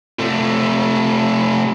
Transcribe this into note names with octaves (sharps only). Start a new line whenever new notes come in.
C3 A3